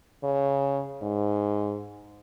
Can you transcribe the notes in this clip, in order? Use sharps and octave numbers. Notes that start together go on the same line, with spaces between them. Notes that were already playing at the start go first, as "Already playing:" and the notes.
C#3
G#2